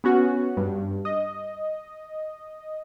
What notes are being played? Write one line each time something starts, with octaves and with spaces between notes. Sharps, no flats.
B3 C#4 F#4
G2
D#5